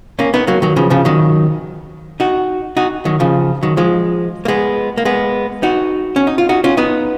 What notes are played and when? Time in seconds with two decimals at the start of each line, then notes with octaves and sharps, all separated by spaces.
0.19 A#3 C#4
0.34 B3 D#4
0.47 F#3 A#3
0.62 D#3 F#3
0.76 C#3 F3
0.90 C#3 F3
1.05 D#3 F#3
2.20 D#4 F#4
2.77 D#4 F#4
3.05 D#3 F#3
3.20 C#3 F3
3.63 D#3 F#3
3.77 F3 G#3
4.45 A#3
4.48 G#3 B3
4.98 A#3
5.05 G#3 B3
5.63 D#4 F#4
6.16 C#4
6.27 D#4
6.38 F4
6.49 D#4 F#4
6.64 C#4 F4
6.77 B3 D#4